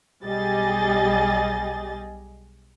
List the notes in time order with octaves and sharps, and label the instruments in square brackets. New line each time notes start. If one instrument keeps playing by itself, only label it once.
[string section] B1 G3 G4 G#4 D#5 A6